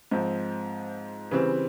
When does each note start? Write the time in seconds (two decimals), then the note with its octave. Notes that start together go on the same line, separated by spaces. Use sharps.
0.11 G#2 F3 C4
1.31 C#3 E3 G3 C4